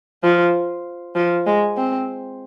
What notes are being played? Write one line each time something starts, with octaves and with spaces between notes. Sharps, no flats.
F3
F3
G#3
C4